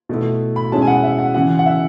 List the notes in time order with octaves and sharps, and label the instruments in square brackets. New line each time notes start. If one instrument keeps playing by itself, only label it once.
[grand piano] B2 A3 E4
B5
B2 G#3 C#4 E4 A5
G#5
F#5
E5
F#5
C#3 E3 B3 F#5
F#5
E5